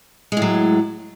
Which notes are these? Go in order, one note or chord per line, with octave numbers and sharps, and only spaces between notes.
A2 F#3 G#3